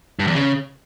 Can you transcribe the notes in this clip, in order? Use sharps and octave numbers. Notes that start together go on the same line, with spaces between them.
G2
E2
C#3